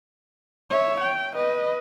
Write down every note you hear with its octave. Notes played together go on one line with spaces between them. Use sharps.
C#5 E5
G5
B4 D#5